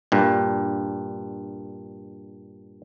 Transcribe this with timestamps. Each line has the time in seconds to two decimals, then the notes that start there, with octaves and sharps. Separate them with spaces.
0.12 G2 A#2